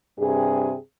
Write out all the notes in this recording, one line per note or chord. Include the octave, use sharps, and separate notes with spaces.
G2 C3 G#4